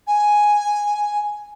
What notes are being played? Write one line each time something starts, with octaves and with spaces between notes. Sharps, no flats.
G#5